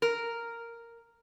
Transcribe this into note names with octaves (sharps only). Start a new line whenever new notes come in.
A#4